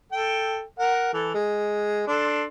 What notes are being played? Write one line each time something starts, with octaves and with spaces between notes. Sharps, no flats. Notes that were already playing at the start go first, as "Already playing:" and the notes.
A4 G5
A#4 F#5
E3 A4
G#3
D4 A4 C6